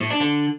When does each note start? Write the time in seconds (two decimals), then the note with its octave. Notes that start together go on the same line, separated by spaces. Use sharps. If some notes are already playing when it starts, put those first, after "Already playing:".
0.01 A2
0.10 D4
0.20 D3